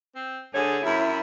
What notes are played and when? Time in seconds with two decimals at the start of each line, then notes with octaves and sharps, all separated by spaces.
0.15 C4
0.54 D3 G#4 C#5
0.85 F#2 E4